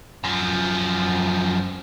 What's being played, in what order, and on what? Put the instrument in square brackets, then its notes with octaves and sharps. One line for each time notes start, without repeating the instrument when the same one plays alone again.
[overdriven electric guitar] F#2 F3